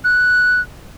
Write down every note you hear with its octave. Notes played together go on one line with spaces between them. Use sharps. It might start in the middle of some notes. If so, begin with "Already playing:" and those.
F#6